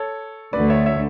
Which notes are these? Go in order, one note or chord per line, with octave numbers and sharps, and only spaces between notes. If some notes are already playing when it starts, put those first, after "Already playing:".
Already playing: A4 C#5
D2 D3 A3 B4 D5
C#5 E5
C#5 E5